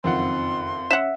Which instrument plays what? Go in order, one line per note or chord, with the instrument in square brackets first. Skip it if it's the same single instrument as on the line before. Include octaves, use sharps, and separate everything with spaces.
[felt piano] F#1 F2 D#3 [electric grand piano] C4 F4 F#5 [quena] C6
[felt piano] C#4 [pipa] E5 F#5